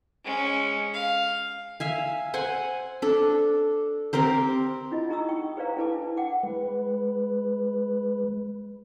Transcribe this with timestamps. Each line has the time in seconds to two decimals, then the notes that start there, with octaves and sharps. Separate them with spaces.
0.25 G#3 C#4
0.93 F5
1.80 E5 F5 G#5
2.34 C5 F#5 G#5
3.02 D4 A4
4.13 C4 G4 A#4 C5
4.92 D4 E4 F4 D#5
5.09 D#4 G#4 A#5 C#6 D#6 E6
5.28 G5 C#6
5.57 G#4 B4 C5 D5 F5 A#5
5.76 D4 E4 A4 B4 A5 D6
6.17 F#5 G5 D6
6.43 G#3 B4